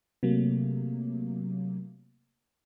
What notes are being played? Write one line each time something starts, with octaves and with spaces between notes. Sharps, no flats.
C3 F#3 A3 A#3